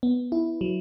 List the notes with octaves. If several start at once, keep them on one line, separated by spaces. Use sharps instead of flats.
B3
E4
F#3